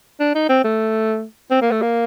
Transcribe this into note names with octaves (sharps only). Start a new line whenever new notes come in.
D4
D#4
C4
A3
C4
A#3
A3
A#3